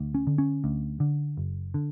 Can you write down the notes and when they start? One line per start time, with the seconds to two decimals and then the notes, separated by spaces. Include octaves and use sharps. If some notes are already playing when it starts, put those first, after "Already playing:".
Already playing: D2
0.15 C#4
0.27 D3
0.38 C#4
0.64 D2
1.00 D3
1.37 F#1
1.74 D3